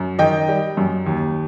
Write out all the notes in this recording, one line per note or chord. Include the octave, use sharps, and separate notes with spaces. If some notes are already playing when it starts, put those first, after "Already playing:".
Already playing: F#2
D#3 D#5 G5
G3
F#2
D#2